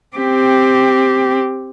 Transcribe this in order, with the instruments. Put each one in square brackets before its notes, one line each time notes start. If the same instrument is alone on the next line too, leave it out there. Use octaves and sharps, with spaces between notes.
[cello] C4 G4